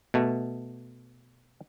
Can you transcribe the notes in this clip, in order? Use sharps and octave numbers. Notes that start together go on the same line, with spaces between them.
B2 A3